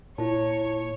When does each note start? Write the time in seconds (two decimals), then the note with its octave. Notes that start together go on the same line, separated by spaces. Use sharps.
0.18 A#2 E4 C#5 A5